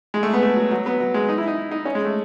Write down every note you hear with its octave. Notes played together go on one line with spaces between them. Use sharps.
G#3
A3
B3
A3
F#3
F#3
B3
F#3
G#3
D#4
E4
D#4
D#4
C#4
G#3
A3